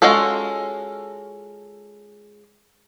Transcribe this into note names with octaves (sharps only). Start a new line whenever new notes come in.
G#3 C#4 F4 F#4 A4